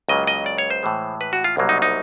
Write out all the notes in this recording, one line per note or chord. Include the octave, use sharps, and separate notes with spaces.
C#2 C#3 F#3 A#3 D#5
D#5
D5
C#5
C5
A2 E3 G#3
B4
F#4
F4
C2 B2 F#3 A#3
D#4
D#4